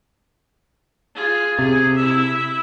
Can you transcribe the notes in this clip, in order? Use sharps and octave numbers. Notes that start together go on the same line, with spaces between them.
F4 G#4
C3 G#4
E4 E5